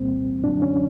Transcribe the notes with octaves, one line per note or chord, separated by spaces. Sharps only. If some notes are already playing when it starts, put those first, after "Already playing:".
Already playing: C2 A#2 G3 A#3 C4
F#2 D3 F#3 D4
C#4